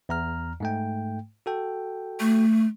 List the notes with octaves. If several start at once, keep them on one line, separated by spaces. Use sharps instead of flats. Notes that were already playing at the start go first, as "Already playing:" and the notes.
E2 A#5 F6
G#2 A3 G5
F#4 A4 G5
A3